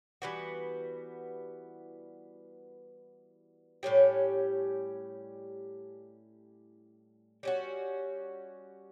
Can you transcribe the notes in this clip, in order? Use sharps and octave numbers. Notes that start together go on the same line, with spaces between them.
E3 G3 B3 F#4
A2 G3 C#4 G4
G3 C#4 F#4